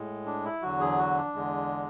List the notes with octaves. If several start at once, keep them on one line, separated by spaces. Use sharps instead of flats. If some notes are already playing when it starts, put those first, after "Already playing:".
Already playing: A2 G#3
D4
E4
E2 D3 F#3 F#4
G#4
F#4
D4
E2 D3 G#3